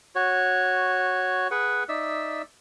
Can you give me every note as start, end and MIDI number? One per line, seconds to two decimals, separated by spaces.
0.15 1.48 66
0.15 1.48 73
1.51 1.84 68
1.51 1.84 71
1.51 1.84 78
1.89 2.42 63
1.89 2.42 74
1.89 2.42 76
1.89 2.42 88